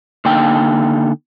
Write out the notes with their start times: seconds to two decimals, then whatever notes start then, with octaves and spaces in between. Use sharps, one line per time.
0.25 D3 A#3 D#4 G5